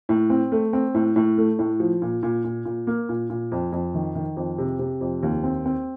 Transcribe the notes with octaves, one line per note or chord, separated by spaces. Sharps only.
A2
C4
A3
C4
A2
A2
A3
A2
F3
A#2
A#2
A#2
A#2
A#3
A#2
A#2
F2
F2
D#3
D#3
F2
C3
C3
F2
D#2
C4
C4